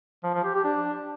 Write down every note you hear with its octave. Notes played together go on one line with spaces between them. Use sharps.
F3
F3
G4
G4
D4